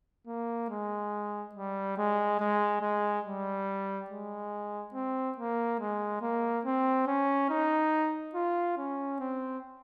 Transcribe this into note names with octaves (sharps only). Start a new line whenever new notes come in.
A#3
G#3
G3
G#3
G#3
G#3
G3
G#3
C4
A#3
G#3
A#3
C4
C#4
D#4
F4
C#4
C4